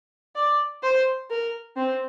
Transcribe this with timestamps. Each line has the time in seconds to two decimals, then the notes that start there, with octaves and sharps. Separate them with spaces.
0.35 D5
0.83 C5
1.30 A#4
1.77 C4